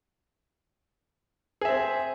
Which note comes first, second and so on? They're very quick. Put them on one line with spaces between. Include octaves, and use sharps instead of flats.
G#4 E5 C4